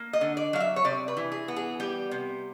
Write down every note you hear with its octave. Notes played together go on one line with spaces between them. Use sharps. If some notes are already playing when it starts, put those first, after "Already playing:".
Already playing: A#3
D#5
D3
D5
F#3 F5
E5
C#5
C3 D5
B4
E3
G#4
B3
G#4
G3 G4
C3